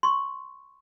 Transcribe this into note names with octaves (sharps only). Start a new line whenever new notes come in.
C6 C#6